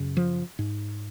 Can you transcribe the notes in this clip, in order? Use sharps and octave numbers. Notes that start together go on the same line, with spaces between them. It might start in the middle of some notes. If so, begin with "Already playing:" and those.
Already playing: F#2 C#3
F3
G#2